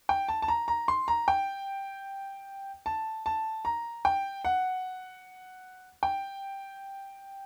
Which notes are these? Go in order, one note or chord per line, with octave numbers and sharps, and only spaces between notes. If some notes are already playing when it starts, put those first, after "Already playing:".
G5
A5
A5
A#5
A#5
C6
A#5
G5
A5
A5
A#5
G5
F#5
G5